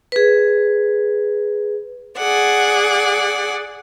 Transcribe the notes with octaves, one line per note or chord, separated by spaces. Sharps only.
G#4 B4
G#4 D5 F#5